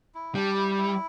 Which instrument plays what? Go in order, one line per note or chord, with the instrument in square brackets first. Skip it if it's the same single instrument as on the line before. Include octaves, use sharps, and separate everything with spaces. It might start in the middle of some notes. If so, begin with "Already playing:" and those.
[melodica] E4
[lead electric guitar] G3 [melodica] D4
[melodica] E4
E4